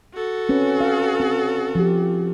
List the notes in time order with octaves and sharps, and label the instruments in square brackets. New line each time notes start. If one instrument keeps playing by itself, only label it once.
[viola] F#4 A4
[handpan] C4 C#4 B4
F5
C4
F3 G4